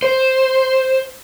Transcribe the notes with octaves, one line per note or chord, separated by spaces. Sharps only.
C5